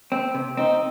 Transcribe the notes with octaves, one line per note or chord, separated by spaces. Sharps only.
C4
C3
C4 D#4